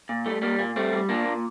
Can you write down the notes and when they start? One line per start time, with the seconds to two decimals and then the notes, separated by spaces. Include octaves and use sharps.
0.09 A#2
0.26 G3 A3
0.42 G3 A#3
0.59 A#2 A#3
0.76 G3 A3 C4
0.93 G3
1.09 A#2 A#3 D4
1.26 A#2